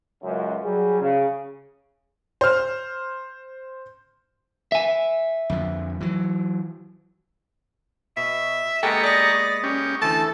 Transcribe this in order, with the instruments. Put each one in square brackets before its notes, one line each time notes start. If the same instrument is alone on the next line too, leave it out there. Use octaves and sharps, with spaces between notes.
[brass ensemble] C#2 F#2
F#3 G3 G#4
C#3
[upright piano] C5 F6
[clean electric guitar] E5 G#5
[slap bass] F2 D3 F3
E3 F#3
[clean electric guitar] B2 [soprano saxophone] E5
[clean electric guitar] G#3 A#3 B3 [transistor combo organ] G4 A#5 C#6 [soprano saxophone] A4 [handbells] G5
[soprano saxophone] D5 [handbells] D#6 A#6
[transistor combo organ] C#4 G4
[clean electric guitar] D2 E3 A3 [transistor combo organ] A4 [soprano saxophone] A5